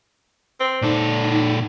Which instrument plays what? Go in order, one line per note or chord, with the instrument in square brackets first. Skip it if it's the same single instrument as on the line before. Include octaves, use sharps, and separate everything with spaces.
[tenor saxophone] C4
[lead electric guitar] A#2 A4 [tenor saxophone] D4 [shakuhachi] D#4